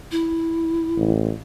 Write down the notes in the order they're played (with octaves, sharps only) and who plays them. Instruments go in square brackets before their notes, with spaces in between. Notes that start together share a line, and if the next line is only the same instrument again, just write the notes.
[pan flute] E4
[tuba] A1